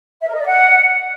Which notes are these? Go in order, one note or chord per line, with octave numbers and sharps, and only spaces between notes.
E5
A#4
D#5
D5
F#5